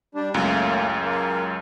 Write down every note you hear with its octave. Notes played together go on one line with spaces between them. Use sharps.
G3 D4
C#2 F#2 A2 A#3
A#3